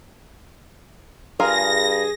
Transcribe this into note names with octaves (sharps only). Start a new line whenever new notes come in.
G2 F4 G#4 A#4 F5 A#6